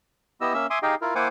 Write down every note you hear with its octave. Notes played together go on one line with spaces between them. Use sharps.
B3 E4 G4 D#5 E6
A#3 C#4 E5 E6
E5 G#5 C6 D6 D#6
D#4 G4 G#4 D#5 F5 G5
E4 F4 A#4
A#3 E4 C5 F#5 G#5 D6